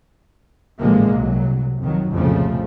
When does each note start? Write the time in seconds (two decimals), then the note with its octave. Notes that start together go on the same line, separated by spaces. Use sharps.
0.80 A1 A#2 D3 F3 G#3 A#3
1.14 C2 F#3
1.80 F2 D#3 F#3
2.13 C2 F2 A#2 C#3 F3 A3